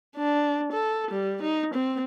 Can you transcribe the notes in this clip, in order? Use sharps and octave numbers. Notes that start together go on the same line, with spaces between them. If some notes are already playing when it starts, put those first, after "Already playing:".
D4
A4
G3
D#4
C4